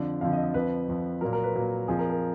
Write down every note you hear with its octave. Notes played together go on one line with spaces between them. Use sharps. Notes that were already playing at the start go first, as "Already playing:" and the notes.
Already playing: F2 D3 F3 D5
F2 D3 F3 F5
D#5
D#5
F2 F3 B4
F2 F3
A#2 F#3 A#4
A#4
B4
A#2 F#3
F2 F3 G#4
A#4
A#4